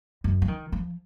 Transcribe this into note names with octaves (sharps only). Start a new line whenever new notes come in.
F#2
F3
D#3
F3